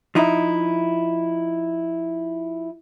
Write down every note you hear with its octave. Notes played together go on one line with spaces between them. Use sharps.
F3 D#4 E4